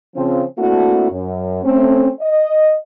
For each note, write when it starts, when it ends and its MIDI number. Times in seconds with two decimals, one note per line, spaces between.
0.15 0.42 49
0.15 0.42 53
0.15 0.42 60
0.58 1.08 57
0.58 1.08 58
0.58 1.08 60
0.58 1.08 62
0.58 1.08 64
0.58 1.08 66
1.10 1.60 42
1.63 2.08 57
1.63 2.08 60
1.63 2.08 61
2.20 2.73 75